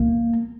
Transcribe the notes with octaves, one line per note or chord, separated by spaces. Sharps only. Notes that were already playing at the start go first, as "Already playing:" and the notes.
Already playing: A#3